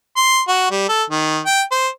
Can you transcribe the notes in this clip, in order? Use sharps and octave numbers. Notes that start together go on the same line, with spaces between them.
C6
F#4
G3
A4
D#3
G5
C5